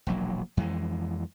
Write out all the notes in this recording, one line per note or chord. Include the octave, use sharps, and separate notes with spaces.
E1 A#1 F#3 A#3
F2 E3 G#3